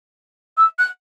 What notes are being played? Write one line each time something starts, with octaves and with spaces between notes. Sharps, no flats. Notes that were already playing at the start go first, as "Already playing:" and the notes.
E6
F#6